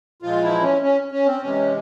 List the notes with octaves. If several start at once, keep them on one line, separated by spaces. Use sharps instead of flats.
A#2 F3 G#3 F4
E3 E4
C#4
C#4
C#4
C4
C3 E3 G#3 C#4